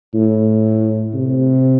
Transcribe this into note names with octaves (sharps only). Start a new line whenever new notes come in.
A2
C3